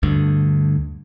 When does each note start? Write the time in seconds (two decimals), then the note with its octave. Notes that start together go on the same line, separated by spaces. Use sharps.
0.03 D2 G2 D3